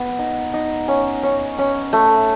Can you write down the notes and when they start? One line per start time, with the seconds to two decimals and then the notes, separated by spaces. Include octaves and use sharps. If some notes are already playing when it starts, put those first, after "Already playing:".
Already playing: B3
0.19 D#4
0.54 D#4
0.88 C#4
1.23 C#4
1.58 C#4
1.93 A3